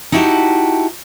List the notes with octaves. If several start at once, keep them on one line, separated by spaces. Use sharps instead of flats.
D#4 E4 F#4 G4 A5